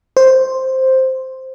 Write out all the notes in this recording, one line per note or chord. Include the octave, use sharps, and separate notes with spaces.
C5